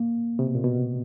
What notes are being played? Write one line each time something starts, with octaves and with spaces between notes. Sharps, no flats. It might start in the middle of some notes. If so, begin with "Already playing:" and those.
Already playing: A#3
C3
B2
A#2
B2